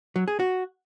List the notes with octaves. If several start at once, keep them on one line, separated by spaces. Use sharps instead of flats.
F#3
G#4
F#4